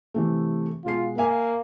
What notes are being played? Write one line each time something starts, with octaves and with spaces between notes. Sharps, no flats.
C3 E3 A3
B2 G#3 F4 C7
A#3 E5 G#5